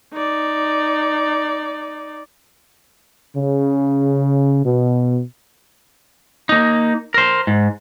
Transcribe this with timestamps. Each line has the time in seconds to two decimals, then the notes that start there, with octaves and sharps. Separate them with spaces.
0.14 D#4 D5
3.36 C#3
4.65 B2
6.49 A#3 D#4
7.14 A#4 C5
7.47 G#2